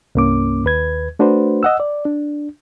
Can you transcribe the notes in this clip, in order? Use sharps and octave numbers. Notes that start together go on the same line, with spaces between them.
C2 G2 A#3 C#4 D6
D#2 B4 G#6
A3 D4 F#4 B4 C5
D#5 F#5 E6
D5
D4